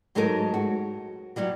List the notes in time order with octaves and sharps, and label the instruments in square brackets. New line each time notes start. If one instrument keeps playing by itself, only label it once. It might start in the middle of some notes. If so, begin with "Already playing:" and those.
[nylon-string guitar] G#2 F#3 G#3 D#4 A4 A#4
F#4
F#3 G3 E4 F#4